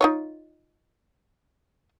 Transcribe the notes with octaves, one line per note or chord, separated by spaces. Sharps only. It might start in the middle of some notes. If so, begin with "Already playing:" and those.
D#4 F4 C#5